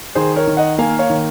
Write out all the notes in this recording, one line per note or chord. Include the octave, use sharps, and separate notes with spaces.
D#3 G#4 C5
A#4 C#5
D#3
D#5 F#5
A#3 F5 G#5
C#5 F5
D#3